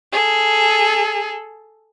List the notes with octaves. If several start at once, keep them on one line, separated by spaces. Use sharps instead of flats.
G#4 A4